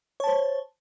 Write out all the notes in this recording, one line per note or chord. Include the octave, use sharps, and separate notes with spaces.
C5 C#5 A5